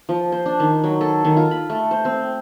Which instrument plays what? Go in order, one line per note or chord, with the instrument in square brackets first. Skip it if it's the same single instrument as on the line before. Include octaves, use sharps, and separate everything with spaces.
[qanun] F3
C5
D4
D#3
F#3
A4
D#3
F4
B5
A3
C5
C4